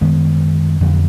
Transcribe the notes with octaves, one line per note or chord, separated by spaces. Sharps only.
F#2 D#3 G#3 B3
F2 D3 F#3